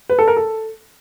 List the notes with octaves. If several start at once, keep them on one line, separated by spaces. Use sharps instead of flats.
B4
A4
A#4
A4